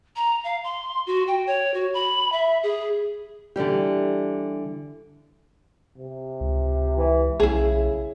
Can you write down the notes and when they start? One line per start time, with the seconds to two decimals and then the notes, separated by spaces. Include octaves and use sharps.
0.16 A#5
0.44 F5
0.64 C6
1.07 F#4
1.28 G5
1.47 C#5
1.74 F#4
1.94 B5
2.32 E5
2.63 G#4
3.56 D3 E3 G3 G4
5.98 C3
6.40 C#2
6.98 E3
7.40 B1 C#3 E4 G#4